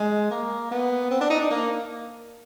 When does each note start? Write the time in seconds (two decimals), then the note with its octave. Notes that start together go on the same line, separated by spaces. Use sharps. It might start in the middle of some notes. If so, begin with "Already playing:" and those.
Already playing: G#3
0.31 A#3
0.71 B3
1.11 C4
1.21 D4
1.30 D#4
1.40 D4
1.51 A#3